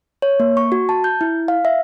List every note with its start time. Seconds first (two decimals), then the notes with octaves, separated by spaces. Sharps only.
0.22 C#5
0.40 A#3
0.57 C#6
0.72 F#4
0.89 A5
1.04 G6
1.21 E4
1.48 F5
1.65 E5